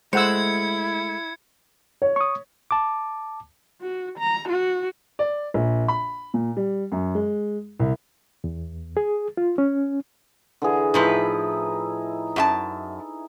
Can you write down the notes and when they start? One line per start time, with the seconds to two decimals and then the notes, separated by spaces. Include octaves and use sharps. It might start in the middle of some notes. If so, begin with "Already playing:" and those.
0.13 G#3 A3 E4 C5 F#5 E6 G#6 C#7
2.02 C#5
2.16 C#6 D#6
2.71 A5 D6
3.81 F#4
4.19 A#5
4.49 F#4
5.19 D5
5.54 A#1
5.88 B5
6.34 A#2
6.57 G3
6.92 F#2
7.15 G#3
7.79 C2
8.44 E2
8.97 G#4
9.37 F4
9.58 C#4
10.62 D3 E3 G#4
10.94 A2 F3 D#4 E4 B4
12.36 F#2 F#4 A5